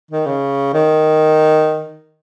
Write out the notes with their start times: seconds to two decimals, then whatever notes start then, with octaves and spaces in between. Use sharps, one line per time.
0.11 D#3
0.26 C#3
0.74 D#3